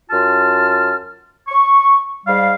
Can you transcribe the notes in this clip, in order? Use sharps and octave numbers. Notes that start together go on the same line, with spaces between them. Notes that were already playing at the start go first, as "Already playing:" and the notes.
F#2 F4 A5 F6
C#6
G#2 G3 F5